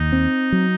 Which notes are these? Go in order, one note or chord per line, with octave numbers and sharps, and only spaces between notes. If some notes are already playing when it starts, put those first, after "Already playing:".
Already playing: D#2 D#4
C4
F#3